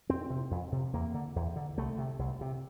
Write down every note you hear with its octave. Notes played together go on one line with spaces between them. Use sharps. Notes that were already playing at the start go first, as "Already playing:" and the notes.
F2 C4
C3
F2
C3
E2 A#3
D3
E2
D3
C2 A3
C3
C2
C3